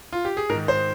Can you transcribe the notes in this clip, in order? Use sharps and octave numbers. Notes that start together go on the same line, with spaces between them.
F4
G4
G#4
G#2 A#4
D#3
C5